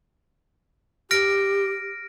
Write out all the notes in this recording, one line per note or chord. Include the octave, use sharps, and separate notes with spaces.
G4 F6 A#6 D7